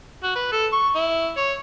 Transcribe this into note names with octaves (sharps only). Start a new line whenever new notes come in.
F#4
B4
A4
C#6
E4
C#5